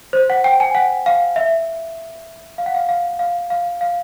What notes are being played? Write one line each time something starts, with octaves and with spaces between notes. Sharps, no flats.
C5
F#5
G5
G#5
F#5
F5
E5
F5
F#5
F5
F5
F5
F5
F5